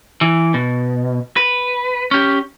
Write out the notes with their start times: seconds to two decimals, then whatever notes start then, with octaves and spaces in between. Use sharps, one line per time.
0.21 E3
0.54 B2
1.36 B4
2.11 C#4 G4